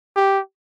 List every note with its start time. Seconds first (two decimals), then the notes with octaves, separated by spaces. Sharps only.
0.16 G4